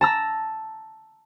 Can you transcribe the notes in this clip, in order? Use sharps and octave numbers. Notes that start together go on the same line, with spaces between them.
A5 A#5 E6